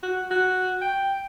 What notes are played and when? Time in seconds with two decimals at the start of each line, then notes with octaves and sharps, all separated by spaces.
0.03 F#4
0.31 F#4
0.82 G5